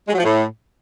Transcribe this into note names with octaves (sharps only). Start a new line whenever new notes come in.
G#3
F#3
F3
A2